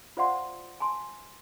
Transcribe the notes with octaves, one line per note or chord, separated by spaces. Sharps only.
F4 C5 D5 F5 F#5 C6
G#5 A5 C6